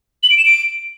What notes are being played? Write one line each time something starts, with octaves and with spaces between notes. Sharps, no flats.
F#7
D7
E7
D7